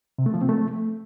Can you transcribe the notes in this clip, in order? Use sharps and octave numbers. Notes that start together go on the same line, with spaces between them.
C3
A3
F3
C4
A3